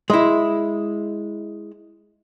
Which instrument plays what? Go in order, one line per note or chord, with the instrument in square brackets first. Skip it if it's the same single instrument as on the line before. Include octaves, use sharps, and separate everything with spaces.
[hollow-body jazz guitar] G#3 E4